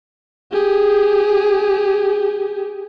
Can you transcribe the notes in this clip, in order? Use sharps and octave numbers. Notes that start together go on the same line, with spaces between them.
G4 G#4